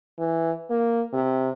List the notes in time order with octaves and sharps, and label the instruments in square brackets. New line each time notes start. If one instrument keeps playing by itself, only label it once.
[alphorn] E3
A#3
C3